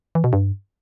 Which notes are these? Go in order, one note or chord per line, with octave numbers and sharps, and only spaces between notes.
E3
B2
G2